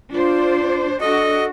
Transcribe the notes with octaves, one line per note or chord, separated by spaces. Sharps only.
D4 F4 C5 D5
D4 F#4 A4 D#5